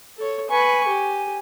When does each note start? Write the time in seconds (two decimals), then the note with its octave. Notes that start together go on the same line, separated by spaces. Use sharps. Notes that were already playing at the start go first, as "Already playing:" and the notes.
0.17 A4 C#5
0.49 B4 G#5 C#6
0.88 G4